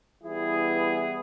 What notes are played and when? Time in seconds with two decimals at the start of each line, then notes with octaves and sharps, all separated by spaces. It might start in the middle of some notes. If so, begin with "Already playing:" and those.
0.21 E3 G3 B3 E4 G#4